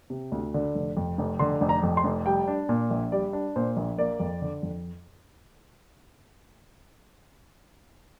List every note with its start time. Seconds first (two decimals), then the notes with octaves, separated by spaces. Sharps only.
0.10 C3
0.32 D2
0.54 D3
0.75 F1
0.97 F2
1.18 F1
1.39 D3 C6
1.61 F1
1.69 A#5
1.83 F2
1.97 C6
2.04 F1
2.26 G3 G5
2.48 D4
2.69 A#2
2.91 A#1
3.12 G3 D5
3.33 D4
3.56 A#2 C5
3.77 A#1
3.98 A#3 D5
4.20 F2
4.42 D3
4.63 F2